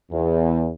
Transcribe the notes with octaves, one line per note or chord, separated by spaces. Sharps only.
E2